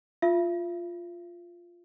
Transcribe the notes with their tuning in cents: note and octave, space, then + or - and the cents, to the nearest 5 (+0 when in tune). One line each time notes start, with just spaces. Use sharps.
F4 +0 E5 +40